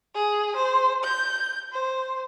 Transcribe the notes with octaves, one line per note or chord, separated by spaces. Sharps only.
G#4
C5
G6
C5